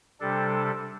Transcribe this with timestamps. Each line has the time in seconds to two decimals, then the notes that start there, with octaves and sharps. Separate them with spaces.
0.20 C3 G3 D4 A4